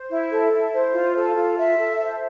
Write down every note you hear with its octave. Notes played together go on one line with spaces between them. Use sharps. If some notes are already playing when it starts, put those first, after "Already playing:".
Already playing: C5
E4
A4
E4
C5
F4
A4
F4
E5
A4
C5